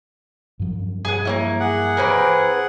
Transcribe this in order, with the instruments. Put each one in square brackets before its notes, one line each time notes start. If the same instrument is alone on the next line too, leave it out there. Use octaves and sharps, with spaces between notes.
[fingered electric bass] G2 F3 F#3
[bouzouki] G#4 F#5
A#3 C#4 E4
[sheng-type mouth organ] G#4 F#5
[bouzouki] E3 C4 A#4